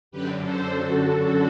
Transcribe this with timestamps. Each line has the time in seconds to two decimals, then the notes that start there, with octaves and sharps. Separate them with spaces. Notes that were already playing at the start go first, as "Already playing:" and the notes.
0.11 F#2 D3 G4 B4
0.41 A4 C5
0.73 F#2 D3 F#4 A4